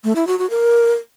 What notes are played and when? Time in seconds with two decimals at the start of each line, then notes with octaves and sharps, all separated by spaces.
0.04 A3
0.16 E4
0.27 F#4
0.39 F#4
0.50 A#4